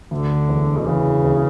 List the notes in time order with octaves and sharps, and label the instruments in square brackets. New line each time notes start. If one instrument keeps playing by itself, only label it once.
[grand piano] D2 [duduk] D3
[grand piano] E1
[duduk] B2
[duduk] C#3 [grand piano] E3
[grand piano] E1